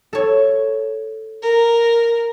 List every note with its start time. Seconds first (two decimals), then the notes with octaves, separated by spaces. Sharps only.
0.13 A4 C#5
1.42 A#4